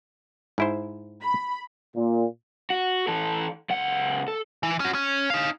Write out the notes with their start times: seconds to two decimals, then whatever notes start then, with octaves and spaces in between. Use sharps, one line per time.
0.58 G#2 E4 C5
1.21 B5
1.95 A#2
2.70 F#4
3.07 E3 A4
3.70 C#2 F#5
4.28 A4
4.63 E3
4.80 C#4 F#4
4.94 C#4
5.30 D#4 F5